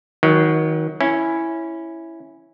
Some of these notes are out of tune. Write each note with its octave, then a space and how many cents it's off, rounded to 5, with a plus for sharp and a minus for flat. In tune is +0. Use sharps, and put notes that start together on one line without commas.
D#3 +30 F#3 +0
C#4 -5 E4 +0